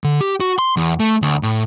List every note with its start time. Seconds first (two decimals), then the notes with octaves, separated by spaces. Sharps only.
0.04 D3
0.21 G4
0.40 F#4
0.59 C6
0.77 E2
1.00 A3
1.22 D2
1.43 A2